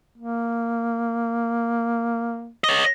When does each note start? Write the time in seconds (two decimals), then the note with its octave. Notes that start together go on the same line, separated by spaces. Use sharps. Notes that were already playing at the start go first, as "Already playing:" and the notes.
0.18 A#3
2.64 C#5 D#5